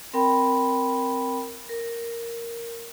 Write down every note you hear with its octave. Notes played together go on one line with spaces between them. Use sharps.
C4 A#4 G5 B5
A#4